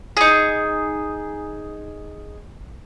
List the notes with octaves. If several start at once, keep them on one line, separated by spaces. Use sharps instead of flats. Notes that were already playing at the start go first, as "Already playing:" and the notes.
D#4 G#4